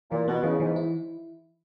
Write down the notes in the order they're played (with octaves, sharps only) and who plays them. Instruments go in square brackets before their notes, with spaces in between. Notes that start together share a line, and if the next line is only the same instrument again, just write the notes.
[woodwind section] A#2 [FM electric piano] E3
[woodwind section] B2 [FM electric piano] B3
[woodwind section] C#3 [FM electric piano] E3
[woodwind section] G#2 [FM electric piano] E3
[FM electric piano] E4